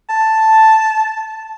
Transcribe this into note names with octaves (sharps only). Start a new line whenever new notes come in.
A5